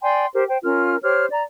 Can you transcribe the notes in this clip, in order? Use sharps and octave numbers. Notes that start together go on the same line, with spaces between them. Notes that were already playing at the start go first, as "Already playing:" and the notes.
D5 G5 G#5 C6
G4 A#4 C5
C5 G5
C#4 F4 A#4 F6
G4 C5 C#5 F6
D5 A#5